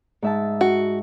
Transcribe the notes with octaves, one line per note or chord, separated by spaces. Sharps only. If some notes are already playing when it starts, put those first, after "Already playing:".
G#2 E5 A5
F#4